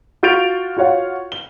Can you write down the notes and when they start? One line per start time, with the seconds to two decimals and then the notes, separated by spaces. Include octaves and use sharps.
0.23 F4 F#4 G6 A6 D7 F7
0.77 F4 F#4 C#5 F5 F#5
1.32 G7